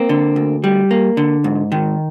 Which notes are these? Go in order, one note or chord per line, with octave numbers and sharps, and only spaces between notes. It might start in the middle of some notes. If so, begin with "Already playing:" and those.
Already playing: A#3 C4
D3
D2
G3
A#3
D3
G#2
D#3